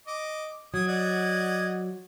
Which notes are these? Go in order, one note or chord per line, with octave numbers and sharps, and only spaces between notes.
D#5 D6
F#3 D#6 G#6
D5 D#5 F#5